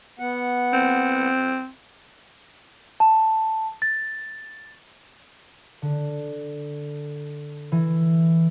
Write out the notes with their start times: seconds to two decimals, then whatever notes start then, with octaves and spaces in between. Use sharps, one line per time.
0.19 B3 F#5
0.73 C4
3.00 A5
3.82 A6
5.82 D3
7.72 E3